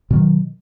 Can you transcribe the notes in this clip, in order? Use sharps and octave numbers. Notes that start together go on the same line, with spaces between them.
B2 D#3 F#3